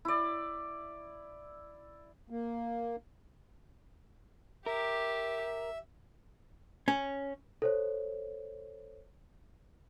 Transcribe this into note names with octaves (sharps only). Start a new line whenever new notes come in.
E4 D5
A#3
G4 A#4 E5
C#4
A4 C5 C#5